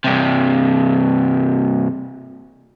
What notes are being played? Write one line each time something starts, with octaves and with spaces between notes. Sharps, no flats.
G2 C3